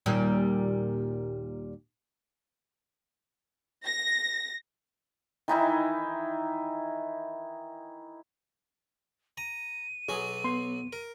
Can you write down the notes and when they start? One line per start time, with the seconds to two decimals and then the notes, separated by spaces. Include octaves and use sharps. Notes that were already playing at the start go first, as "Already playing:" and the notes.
0.06 D#2 A#2 G3
3.85 A#6
5.48 D#3 E3 D#4 E4
9.38 A#5 D#7
10.09 B1 F#3 F#4 G#4
10.44 B3 C6
10.93 A#4